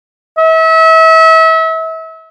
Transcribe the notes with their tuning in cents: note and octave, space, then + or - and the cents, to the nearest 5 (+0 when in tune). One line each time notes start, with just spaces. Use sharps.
E5 -35